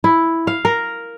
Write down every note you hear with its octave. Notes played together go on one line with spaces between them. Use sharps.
E4
F5
A#4